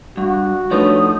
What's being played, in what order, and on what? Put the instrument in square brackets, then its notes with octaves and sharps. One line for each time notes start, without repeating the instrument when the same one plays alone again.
[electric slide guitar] G2 [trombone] F#4
[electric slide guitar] F3 A3 D#4 [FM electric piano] D4 B4 C#5 [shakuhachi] D#6